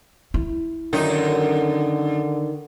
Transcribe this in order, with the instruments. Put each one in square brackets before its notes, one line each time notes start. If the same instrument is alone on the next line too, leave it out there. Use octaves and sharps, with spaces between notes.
[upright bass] E4
[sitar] F#2 D#4 [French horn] D3 [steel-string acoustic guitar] D#3